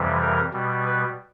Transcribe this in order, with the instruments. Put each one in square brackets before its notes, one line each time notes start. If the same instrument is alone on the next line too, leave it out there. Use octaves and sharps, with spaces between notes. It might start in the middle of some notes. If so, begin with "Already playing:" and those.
Already playing: [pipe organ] F2 C3 E3 G3
A#4
B2 G3
B4